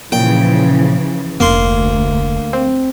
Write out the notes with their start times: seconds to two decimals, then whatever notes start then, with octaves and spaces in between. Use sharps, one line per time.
0.12 A#2 C#3 E3 F3 G5
1.40 F1 D2 A#3 C6
2.53 C4